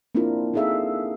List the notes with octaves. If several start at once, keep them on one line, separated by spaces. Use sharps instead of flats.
A#3 C4 D4 E4 F4 A#4
C4 D#4 G#4 A4 E5 F5